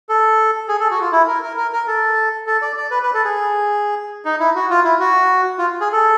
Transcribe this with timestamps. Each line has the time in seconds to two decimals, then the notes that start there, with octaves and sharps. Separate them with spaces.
0.09 A4
0.69 G#4
0.80 A4
0.91 F#4
1.01 F4
1.12 E4
1.28 A#4
1.43 A#4
1.57 A#4
1.73 A#4
1.87 A4
2.47 A4
2.62 D5
2.77 D5
2.91 B4
3.03 B4
3.14 A4
3.24 G#4
4.25 D#4
4.40 E4
4.55 F#4
4.70 F4
4.84 E4
5.00 F#4
5.58 F4
5.81 G#4
5.92 A4